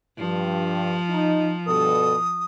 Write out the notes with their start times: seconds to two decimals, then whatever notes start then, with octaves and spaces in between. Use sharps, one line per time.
0.19 G2 F3
1.09 D#4
1.67 G2 B2 A4 D#6